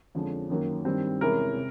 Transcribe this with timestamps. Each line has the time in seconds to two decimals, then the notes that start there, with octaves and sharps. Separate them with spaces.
0.15 F2 D3 F3 G#3 C#4
0.50 F#2 D#3 F#3 A#3
0.85 G2 D#3 G3 C4
1.21 E2 C3 E3 G#3 C#4 A#4
1.56 C3